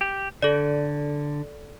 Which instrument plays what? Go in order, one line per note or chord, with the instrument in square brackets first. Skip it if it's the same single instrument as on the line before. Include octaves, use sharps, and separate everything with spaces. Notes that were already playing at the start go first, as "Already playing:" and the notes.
[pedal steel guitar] G4
[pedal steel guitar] D3 [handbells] A4 D5